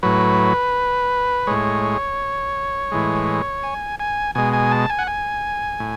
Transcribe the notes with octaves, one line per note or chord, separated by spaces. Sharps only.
A2 F#3 B4
A2 G#3 C#5
A2 E3 G#3
G#5
G#5
B2 G#3 G#5
G#5
A5
G#5
F#5
G#5
A2